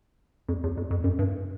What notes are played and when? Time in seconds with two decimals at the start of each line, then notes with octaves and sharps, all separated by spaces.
0.48 F2
0.64 E2
0.77 F2
0.91 F2
1.04 F#2
1.19 G2